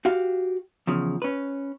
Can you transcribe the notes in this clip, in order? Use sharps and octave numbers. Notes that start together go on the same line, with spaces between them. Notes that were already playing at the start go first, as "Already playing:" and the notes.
F#4 G4 F5
E2 C#3 F3
C#4 B4